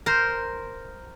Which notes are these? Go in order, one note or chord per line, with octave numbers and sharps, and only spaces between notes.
A#4 C5